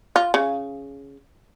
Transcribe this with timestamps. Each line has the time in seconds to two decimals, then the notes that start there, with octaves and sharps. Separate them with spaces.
0.16 F4
0.34 C#3